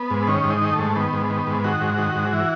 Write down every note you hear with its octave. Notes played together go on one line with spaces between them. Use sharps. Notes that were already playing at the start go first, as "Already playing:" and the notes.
Already playing: B3
G#2
D#3 C#4
G#2
D#4
D#3
A3
G#2
D#3 B3
G#2
D#3
G#2
D#3 F#4
G#2
D#3
G#2
E3